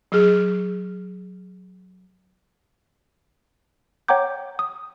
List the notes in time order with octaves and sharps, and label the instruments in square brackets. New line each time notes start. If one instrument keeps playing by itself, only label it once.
[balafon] F#3 G#4
[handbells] C#5 F#5 G5 A#5 D6 G6
D#6